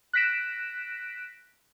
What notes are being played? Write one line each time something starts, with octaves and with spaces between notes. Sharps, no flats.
F#6 A#6 B6 D7 E7